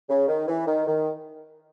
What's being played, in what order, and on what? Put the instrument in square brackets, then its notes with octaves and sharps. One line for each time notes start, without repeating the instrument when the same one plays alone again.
[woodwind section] C#3
D#3
E3
D#3
D#3